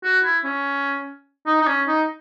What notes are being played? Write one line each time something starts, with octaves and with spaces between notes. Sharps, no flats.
F#4
E4
C#4
D#4
D#4
C#4
D#4